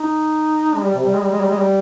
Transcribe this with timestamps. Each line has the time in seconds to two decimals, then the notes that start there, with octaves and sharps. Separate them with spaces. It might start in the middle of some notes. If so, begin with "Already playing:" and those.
Already playing: D#4
0.75 G#3
0.84 G3
0.95 C3
1.05 G3
1.15 G#3
1.23 G3
1.32 G#3
1.41 G3
1.50 G#3
1.58 G3